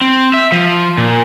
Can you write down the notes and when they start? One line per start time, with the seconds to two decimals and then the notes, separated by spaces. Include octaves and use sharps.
0.01 C4
0.34 E5
0.52 F3
0.98 A#2